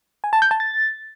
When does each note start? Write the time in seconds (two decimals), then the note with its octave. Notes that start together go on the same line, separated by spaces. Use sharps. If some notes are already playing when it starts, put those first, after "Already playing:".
0.24 G#5
0.33 A5
0.42 G6
0.51 A5
0.60 A6